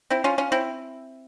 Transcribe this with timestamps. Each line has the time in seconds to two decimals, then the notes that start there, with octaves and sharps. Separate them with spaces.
0.10 C4 E4
0.24 C#4 F4
0.38 C#4 F4
0.52 C4 E4